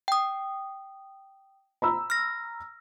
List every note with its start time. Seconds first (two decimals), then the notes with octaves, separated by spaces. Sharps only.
0.08 G5 D#6
1.82 A#5 B5 E6
2.10 F6 A#6